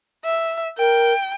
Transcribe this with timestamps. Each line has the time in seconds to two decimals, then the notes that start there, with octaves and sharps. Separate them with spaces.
0.25 E5
0.78 A#4 G5